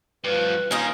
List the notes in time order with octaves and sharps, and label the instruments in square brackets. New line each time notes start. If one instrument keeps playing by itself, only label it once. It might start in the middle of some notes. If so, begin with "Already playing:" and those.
[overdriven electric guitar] G2 F3 [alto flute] B4
[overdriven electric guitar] D#3 A#3 [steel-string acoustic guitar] C#4 D#4 F4